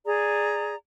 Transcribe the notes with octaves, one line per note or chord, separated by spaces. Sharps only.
G#4 D5 A#5